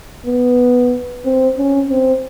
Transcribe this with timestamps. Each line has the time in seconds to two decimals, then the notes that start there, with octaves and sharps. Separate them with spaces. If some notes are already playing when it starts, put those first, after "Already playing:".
0.26 B3
1.25 C4
1.58 C#4
1.90 C4